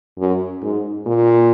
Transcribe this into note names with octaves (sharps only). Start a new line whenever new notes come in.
F#2
G#2
A#2